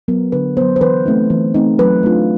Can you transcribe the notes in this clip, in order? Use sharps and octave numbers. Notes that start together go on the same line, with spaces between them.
F#3 B3 A#4
D3 B4
F#3 B3 C5
C5
E3 B4
A3 C4 D#4
E3
A3 C4 D#4
F#3 B4
A3 D4 F4